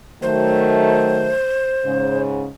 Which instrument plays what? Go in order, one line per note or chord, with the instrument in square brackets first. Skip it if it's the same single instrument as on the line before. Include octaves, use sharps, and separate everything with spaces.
[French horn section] D#3 F#3 A3 [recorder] C5
[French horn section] G#2 C#3